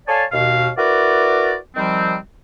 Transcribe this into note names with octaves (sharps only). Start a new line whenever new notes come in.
A4 C#5 D5 F5 G#5 A5
D#2 B2 F5
E4 F#4 A#4 B4 D5
C3 D#3 F3 G3 C4